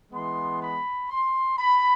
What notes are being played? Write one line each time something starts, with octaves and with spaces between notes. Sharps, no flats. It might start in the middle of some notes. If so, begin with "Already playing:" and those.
E3 G#3 B3 C6
B5
C6
B5